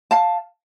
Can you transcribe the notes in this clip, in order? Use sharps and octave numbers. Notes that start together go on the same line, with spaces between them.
F5 A5